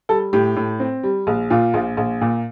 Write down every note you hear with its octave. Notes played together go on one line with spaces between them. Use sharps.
G3 A4
A2 G4
A2
C4
G3
A#1
A#2 F4
A#1
A#1
A#2